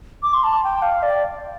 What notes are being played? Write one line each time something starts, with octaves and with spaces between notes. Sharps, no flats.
D6
C6
A5
G5
F5
D5